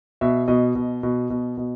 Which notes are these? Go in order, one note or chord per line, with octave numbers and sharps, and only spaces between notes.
B2 E5
B2 D#5
B2
B2
B2
B2